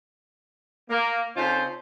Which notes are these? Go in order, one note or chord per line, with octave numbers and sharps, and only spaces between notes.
A#3
C#3 C4 D#4 F4 A4 C5